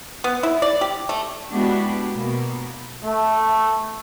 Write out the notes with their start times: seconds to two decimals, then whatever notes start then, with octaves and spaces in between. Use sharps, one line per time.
0.24 B3
0.43 E4
0.62 D5
0.81 G4
1.09 A3
1.51 G#3 B3 D4 E4 F#4 G4
2.13 B2 A#3 B3
3.03 A3